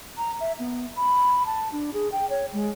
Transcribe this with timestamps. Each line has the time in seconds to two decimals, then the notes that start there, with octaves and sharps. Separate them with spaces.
0.17 A#5
0.40 E5
0.59 B3
0.96 B5
1.46 A5
1.72 D4
1.94 G#4
2.12 G5
2.30 C#5
2.53 G#3